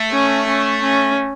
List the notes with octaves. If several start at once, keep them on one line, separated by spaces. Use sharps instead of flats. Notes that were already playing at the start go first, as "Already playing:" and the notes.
Already playing: A3
C#4
C#4
C#4